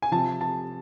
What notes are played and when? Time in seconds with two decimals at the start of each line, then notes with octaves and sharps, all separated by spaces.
0.02 G#5
0.12 C3 F3 A5
0.41 A5